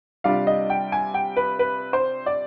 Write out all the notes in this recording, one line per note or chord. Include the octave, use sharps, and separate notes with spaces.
C3 G3 D4 F4 F5
D#5
G5
G#5
G5
B4
B4
C5
D5